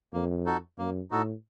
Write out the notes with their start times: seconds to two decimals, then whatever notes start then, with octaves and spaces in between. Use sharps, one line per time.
0.13 F2 A#3
0.46 D#4 F#4 A4
0.78 F#2 A#3
1.11 A2 D#4 F#4 A4